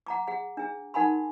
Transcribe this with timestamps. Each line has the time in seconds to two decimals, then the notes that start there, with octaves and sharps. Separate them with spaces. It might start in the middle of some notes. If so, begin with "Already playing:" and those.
0.07 F#5 A#5 D6
0.27 G#4 F#5
0.57 D4 G#4
0.94 D#4 A#4 F#5 G#5 B5 C6